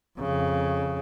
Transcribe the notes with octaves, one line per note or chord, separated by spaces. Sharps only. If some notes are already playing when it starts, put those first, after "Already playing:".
F2 C#3